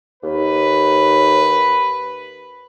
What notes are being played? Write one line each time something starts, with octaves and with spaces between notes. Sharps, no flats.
D#2 B4